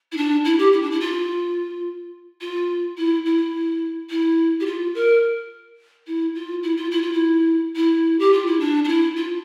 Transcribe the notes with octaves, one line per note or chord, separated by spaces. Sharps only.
E4
D4
E4
G4
E4
D4
E4
F4
F4
E4
E4
E4
G4
F4
A#4
E4
F4
E4
F4
E4
F4
E4
E4
G4
F4
E4
D4
D4
E4
F4